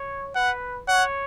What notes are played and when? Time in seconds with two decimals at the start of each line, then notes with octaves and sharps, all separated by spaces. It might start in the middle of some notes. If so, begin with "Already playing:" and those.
Already playing: C#5
0.35 B4 F#5
0.87 C#5 F#5